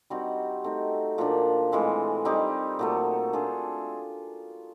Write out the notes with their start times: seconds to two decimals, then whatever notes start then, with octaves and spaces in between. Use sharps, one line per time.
0.10 G3 C4 D#4 F#4
0.64 A3 C4 D#4
1.18 A#2 F3 A#3 D4
1.72 A2 E3 G#3 C4
2.25 G3 C4 D#4 G4
2.79 A#2 F#3 A3
3.33 A3 D4 F4 G#4